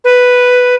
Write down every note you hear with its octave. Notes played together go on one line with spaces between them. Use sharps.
B4